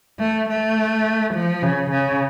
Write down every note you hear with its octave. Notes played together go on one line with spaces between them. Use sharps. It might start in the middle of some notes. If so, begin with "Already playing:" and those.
A3
A3
F3
C#3
C#3